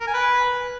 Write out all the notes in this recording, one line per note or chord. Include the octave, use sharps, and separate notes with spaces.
A#4
G#5
B4